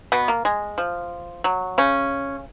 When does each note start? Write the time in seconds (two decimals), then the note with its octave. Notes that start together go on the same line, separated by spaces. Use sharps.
0.12 B2 B3
0.28 A#3
0.45 G#3
0.78 F3
1.44 F#3
1.78 C#3 C#4